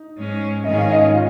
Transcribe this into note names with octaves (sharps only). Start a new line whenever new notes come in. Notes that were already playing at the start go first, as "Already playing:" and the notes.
Already playing: D#4
G#2 G#3 C#4
G#2 D#3 G#3 C#4 G#4 D#5
F5
D#4 D#5
F4 F5